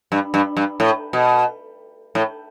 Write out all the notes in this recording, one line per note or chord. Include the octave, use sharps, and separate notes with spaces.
G2
G2
G2
A2
B2
A2